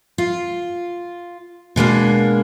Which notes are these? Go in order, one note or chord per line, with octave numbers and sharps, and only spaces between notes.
F4
B2 G#3 A#3 D4